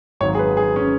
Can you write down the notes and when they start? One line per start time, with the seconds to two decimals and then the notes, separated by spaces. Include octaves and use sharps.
0.20 G#1 G#2 F#3 C#5
0.35 G#4
0.39 B4
0.57 G#4
0.76 C#4